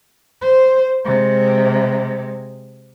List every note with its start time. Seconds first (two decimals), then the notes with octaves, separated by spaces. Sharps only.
0.42 C5
1.05 C3 G#3